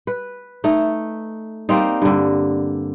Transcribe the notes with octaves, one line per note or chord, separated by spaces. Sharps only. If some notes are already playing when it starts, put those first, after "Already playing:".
B4
A3 D#4
G3 A#3 C4 D#4
G2 D3